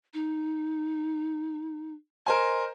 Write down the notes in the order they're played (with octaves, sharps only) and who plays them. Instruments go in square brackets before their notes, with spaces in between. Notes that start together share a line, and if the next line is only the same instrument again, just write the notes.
[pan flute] D#4
[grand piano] A#4 C5 G#5 [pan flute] D#5